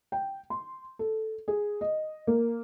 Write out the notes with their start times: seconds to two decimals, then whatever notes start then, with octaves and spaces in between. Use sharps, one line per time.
0.12 G5
0.50 C6
0.99 A4
1.48 G#4
1.81 D#5
2.27 A#3